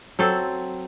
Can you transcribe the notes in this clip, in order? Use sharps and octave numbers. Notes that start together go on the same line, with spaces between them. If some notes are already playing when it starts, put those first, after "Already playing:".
F#3 C4 A4